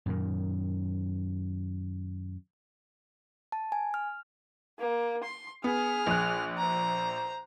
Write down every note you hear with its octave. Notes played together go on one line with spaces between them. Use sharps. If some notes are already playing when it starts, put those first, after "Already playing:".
F#2 A#2 D#3
A5
G#5
F6
A#3
C6
B3 G#4 F6
A#1 F#6
C5 A#5